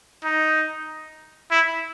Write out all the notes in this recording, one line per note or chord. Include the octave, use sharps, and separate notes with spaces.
D#4
E4